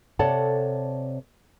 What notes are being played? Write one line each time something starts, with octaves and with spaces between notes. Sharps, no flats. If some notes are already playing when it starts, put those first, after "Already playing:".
C3 A4 C#5 D5 F#5 A5